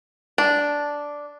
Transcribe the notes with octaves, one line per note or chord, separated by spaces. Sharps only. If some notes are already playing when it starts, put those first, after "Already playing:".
D4